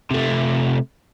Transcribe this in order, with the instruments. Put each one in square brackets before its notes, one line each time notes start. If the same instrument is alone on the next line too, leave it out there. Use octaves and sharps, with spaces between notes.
[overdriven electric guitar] C3 A3